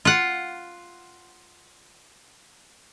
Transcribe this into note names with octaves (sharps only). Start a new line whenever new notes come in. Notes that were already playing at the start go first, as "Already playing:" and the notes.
F4 F#5